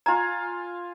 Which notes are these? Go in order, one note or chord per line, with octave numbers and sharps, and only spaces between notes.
F4 G#5 A#5